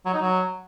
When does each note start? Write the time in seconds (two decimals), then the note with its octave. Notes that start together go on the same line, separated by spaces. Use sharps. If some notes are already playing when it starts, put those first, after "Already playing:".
0.06 F#3
0.14 D#4
0.21 F#3